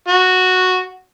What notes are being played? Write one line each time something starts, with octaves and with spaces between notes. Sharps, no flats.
F#4